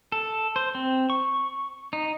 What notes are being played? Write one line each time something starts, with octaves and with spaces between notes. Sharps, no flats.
A4
C5
C4
C#6
D#4